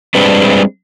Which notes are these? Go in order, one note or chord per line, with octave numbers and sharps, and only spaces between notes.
G3 G#3 C4 D4 B4